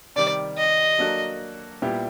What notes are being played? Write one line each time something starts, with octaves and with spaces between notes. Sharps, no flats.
C3 D#3 G3 D5
D#5
F#3 A#3 D4 F#4 A4
A#2 G3 B3 E4 G4